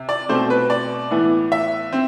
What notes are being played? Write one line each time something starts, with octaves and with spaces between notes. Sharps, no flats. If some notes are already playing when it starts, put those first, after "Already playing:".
Already playing: C3
D5
B2 A3 C4 C5
B4
D5
A2 E3 B3
E5
C4